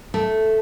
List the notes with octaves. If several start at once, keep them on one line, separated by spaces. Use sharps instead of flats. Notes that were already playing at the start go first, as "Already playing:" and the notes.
A3